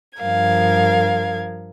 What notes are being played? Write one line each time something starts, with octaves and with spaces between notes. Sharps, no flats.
G2 F3 A#4 F5 G#6